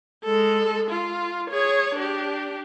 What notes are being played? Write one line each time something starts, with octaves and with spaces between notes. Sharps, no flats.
G#3 A4
F4
G#4 C#5
D4 G4